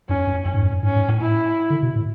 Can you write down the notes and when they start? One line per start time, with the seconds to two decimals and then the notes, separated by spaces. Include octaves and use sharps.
0.09 F#2 C#4
0.27 F#2
0.45 F#2 C#4
0.54 G#2
0.63 F#2
0.83 G#2 C#4
0.96 G#2
1.08 A2
1.21 E4
1.70 D3
1.83 B2
1.95 A2